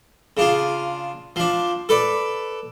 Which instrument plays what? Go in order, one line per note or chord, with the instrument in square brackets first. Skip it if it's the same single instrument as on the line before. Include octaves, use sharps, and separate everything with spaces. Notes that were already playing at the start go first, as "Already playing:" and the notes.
[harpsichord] C#3 D4 F4
F3 D4
A4 B4 D5